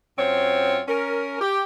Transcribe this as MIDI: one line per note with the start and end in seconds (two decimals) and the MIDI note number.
0.18 0.82 42
0.18 0.82 60
0.18 0.82 65
0.18 0.82 72
0.18 0.82 73
0.88 1.41 61
0.88 1.41 70
1.41 1.64 67